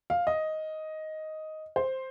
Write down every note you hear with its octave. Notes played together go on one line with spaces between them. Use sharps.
F5
D#5
C5